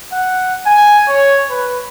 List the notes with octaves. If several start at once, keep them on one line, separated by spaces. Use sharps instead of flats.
F#5
G#5
C#5
B4